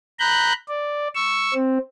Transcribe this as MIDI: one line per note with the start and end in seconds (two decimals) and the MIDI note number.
0.20 0.53 82
0.20 0.53 83
0.20 0.53 90
0.20 0.53 91
0.68 1.08 74
1.15 1.54 85
1.15 1.54 88
1.54 1.78 60